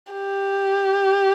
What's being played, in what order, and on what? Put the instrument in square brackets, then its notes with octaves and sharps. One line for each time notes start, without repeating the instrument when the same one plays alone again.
[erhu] G4